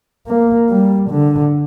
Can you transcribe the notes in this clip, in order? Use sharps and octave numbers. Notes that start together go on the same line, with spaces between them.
A#3
G3
D3